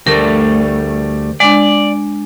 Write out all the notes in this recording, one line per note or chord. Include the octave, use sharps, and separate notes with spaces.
D2 G3 A3 A#4
G#3 D4 D5